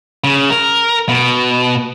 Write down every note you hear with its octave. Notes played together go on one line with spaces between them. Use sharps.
C#3
A#4
B2